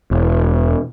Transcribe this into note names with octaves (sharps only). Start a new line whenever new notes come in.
E1